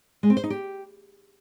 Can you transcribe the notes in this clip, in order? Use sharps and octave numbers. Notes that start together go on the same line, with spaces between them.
G#3
C4
C5
D#4
G4